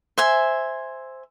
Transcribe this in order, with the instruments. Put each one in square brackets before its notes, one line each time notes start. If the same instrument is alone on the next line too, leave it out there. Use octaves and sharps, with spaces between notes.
[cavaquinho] C5 E5 G#5